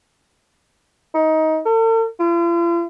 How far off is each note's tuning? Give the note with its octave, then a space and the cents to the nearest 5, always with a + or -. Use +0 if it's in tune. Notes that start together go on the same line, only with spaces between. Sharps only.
D#4 +20
A4 +45
F4 -45